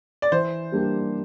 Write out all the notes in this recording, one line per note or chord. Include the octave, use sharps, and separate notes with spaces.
D5
E3 C5
G3 A#3 D4 G4